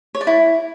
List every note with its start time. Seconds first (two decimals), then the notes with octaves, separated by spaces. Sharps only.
0.15 C#5
0.21 D5
0.27 E4